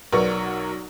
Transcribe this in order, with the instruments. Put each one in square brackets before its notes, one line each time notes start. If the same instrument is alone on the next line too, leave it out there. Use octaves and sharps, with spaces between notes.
[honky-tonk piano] B1 F#3 A#4 D5 C#6